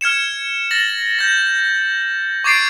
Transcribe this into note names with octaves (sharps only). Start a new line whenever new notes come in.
F6 G#6 C#7 E7
A6 A#6 F#7
G6 A#6
C#6 D6 G#6 A6 C7 D7